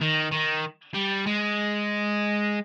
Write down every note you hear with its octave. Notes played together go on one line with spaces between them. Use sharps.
D#3
D#3
G3
G#3